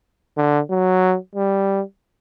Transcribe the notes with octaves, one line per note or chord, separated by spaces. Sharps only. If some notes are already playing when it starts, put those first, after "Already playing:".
D3
F#3
G3